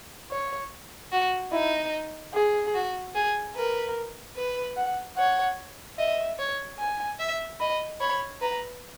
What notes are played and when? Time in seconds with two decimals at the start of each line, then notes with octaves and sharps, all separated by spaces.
0.32 C#5
1.12 F#4
1.53 D#4 E4
2.34 G#4
2.75 F#4
3.15 G#4
3.55 A#4 B4
4.36 B4
4.77 F#5
5.17 C#5 F#5
5.98 D#5 E5
6.39 C#5
6.79 G#5
7.19 E5
7.60 D#5 B5
8.01 C#5 B5
8.41 B4 A#5